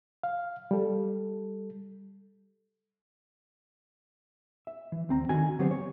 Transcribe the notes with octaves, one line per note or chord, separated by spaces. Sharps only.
F5
G3 A4
E5
E3
D2 C4 A#5
D3 D#3 F#4 G#5
D3 F#3 B3 C4 G4 C5
C#5